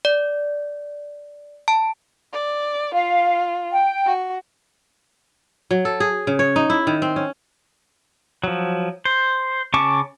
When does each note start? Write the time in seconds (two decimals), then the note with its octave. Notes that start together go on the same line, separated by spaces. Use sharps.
0.05 D5
1.68 A5
2.33 D5
2.94 F4 F5
3.72 G5
4.06 F#4
5.71 F#3
5.85 A4
6.00 G#4
6.27 C#3
6.39 C#5
6.56 D#4
6.70 E4
6.87 D#3
7.02 C4
7.16 C#4
8.44 F3 F#3
9.05 C5
9.74 C#3 C#4 A5 C#6 D6